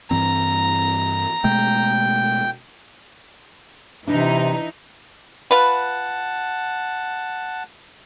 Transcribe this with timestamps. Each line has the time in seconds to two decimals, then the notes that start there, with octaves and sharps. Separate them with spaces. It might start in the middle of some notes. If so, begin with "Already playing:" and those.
0.11 G2 E3 C4 A#5
1.44 B2 G#3 A3 G5
4.08 C3 E3 D4 D#4
5.51 F4 B4 F#5 A5